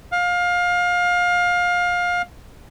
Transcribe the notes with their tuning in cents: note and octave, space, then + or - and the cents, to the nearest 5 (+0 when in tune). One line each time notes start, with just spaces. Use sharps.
F5 +25